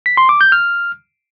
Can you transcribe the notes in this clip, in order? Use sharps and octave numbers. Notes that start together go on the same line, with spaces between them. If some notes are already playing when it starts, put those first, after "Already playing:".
B6
C6
D6
G6
F6